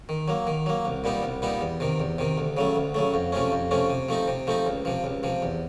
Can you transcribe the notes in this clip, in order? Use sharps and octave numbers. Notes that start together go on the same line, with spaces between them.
D#3
F#3 A#3
D#3
F#3 A#3
C2
A#2 G3 B3 D#4
C2
A#2 G3 B3 D#4
E2
C3 D#3
E2
C3 D#3
D2
C#3 F#3 A3
D2
C#3 F#3 A3
F2
C3 F3 A3 C#4
F2
C3 F3 A3 C#4
C3
F3 A3 C4 D#4
C3
F3 A3 C4 D#4
C#2
C3 F3
C#2
C3 F3
E2